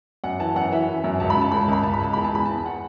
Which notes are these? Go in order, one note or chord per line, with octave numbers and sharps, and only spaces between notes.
F#2 F#5
E3 A5
F#2 F#5
E3 E5
E3
F#2
C#2 A5
B5
C#3
A5
C#2 B5
A5
C#2 B5
C#2 A5
B5
C#2 A5
E2 B5
A5
E2 B5
E2 A5
F#5